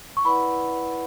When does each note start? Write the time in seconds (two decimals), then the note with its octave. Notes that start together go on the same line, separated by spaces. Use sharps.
0.17 C#6
0.25 E4 B4 D5 F#5 B5